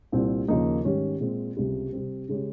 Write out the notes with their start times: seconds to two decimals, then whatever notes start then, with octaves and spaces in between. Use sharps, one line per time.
0.12 C2 A#2 G3 C4
0.48 D#2 C#3 F3 A#3 D#4
0.85 G#2 D#3 G3 C#4 G4
1.21 A#2 G#3 C4
1.57 C#2 C3 G3
1.92 C3 G3 C4
2.29 C#3 G#3 C#4 G4